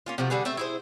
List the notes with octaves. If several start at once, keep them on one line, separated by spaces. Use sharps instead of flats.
A#3 C#4 F4
C3 F3 A3 F#4
D3 G3 G#4 B4
A3 C4 E5
E4 G#4 C5